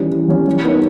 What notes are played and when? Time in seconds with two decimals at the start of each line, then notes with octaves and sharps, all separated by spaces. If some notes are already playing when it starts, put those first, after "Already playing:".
Already playing: E3 G3 C#4
0.11 E3
0.28 G3 C#4
0.47 G3
0.64 B3 D#4 A#4 C#5